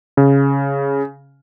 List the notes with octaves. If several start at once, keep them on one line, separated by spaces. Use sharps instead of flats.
C#3